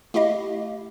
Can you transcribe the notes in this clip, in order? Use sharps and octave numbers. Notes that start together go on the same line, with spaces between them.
A3 E4 G4 D#5 F5